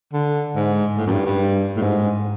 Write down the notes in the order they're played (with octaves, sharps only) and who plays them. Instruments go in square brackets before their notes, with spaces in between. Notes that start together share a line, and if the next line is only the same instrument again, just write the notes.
[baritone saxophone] D3
G#2
A2
F#2
G2
G2
A2
G#2